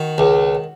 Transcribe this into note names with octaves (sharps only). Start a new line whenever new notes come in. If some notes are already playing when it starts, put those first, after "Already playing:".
Already playing: D#3 F#4
C#2